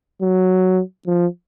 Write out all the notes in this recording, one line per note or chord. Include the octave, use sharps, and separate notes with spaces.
F#3
F3